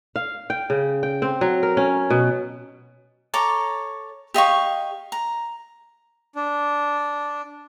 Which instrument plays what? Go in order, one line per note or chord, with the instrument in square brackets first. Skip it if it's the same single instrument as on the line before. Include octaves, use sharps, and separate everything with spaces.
[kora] F5
G5
C#3
G5
C4
F#3
A#4
C#4
B2
[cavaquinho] A4 C#5 A#5 D6
G4 D#5 F5 C#6
A#5
[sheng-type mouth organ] D4